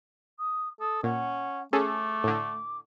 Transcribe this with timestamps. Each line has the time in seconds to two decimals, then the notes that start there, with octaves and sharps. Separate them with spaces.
0.39 D#6
0.80 A4 D#6
1.04 A#2 C#4 F#5
1.73 A3 C#4 G#4 A4 D6
2.24 A2 D3